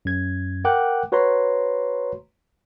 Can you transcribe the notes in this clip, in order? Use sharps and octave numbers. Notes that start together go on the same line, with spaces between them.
F#2 G#6
A#4 F#5 G5 D6 F#6
F#4 B4 C#5 A#5 C6